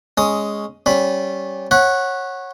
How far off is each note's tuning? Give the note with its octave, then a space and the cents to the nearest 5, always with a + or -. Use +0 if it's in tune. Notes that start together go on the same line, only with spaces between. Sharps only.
G#3 +0 C#4 +0 D#6 +15
G3 -25 C#4 -20 B5 +0
C#5 -20 F#5 +0 B5 -20